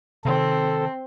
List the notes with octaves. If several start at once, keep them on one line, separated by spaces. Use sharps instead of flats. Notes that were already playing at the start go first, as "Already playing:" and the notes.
C3 D#3 C4 A4